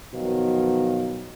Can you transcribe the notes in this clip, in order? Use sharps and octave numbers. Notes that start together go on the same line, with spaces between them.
B2 D#3 F3 F#3